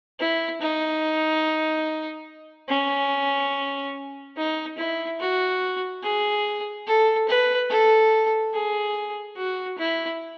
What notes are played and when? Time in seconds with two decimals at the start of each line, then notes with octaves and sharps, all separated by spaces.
0.20 E4
0.61 D#4
2.69 C#4
4.37 D#4
4.78 E4
5.20 F#4
6.04 G#4
6.87 A4
7.28 B4
7.70 A4
8.54 G#4
9.37 F#4
9.78 E4